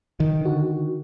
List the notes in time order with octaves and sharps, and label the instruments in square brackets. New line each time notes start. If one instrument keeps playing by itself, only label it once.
[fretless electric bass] D#3
[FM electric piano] D3 F#4